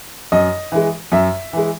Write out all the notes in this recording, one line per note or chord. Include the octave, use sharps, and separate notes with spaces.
F#2 D#5
E3 G#3
F#2 E5
E3 G#3